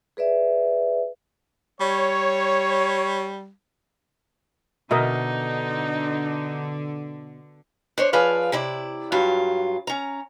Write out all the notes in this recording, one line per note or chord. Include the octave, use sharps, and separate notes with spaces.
G#4 B4 D5 E5
G3 C#5
B2 D3 D#4 A#4 D#5 E5
D4 C5 C#5
F3 G#4 B4 D5 F5
C3 E4 D5
G2 F#3 F4
C#4 A#5